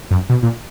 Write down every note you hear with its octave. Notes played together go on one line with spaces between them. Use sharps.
F#2
B2
A#2